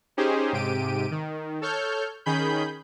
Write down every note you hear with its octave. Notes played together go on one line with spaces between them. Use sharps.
C#4 D#4 G4 G#4 C5
G#2 C3 G4 D7 D#7
D#3
A4 C#5 F6 G6
D#3 C#4 G#4 B5 G6